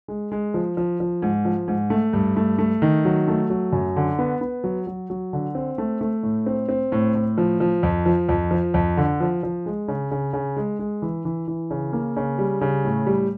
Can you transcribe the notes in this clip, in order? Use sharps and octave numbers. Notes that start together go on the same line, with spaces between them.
G#3
G#3
F3
F3
F3
G#2
F3
G#2
A3
G2
A3
A3
D#3
F#3
A3
F#3
F#2
D3
B3
B3
F#3
F#3
F#3
D3
C4
A3
A3
A2
C4
C4
A2
A2
F3
F3
F2
F3
F2
F3
F2
D3
F3
F3
G#3
C#3
C#3
C#3
G#3
G#3
E3
E3
E3
C#3
A#3
C#3
G3
C#3
A2
G3